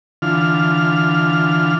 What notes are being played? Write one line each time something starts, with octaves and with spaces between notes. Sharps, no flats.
D3 E3 F4 F6